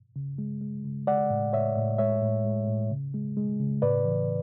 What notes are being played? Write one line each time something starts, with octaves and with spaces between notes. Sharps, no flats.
C#3
G#3
G#3
C#3
G#3 D5 F#5
A2
A2 C#5 E5
A2
G#3 C#5 E5
A2
G#3
A2
C#3
G#3
G#3
C#3
A2 B4 D5
E3